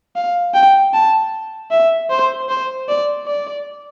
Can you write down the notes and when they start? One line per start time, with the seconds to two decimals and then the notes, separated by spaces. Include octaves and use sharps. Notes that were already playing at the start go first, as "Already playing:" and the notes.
0.16 F5
0.54 G5
0.94 A5
1.71 E5
2.10 C5
2.49 C5
2.88 D5
3.26 D5